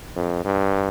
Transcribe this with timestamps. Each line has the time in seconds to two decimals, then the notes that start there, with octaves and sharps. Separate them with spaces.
0.16 F2
0.45 G2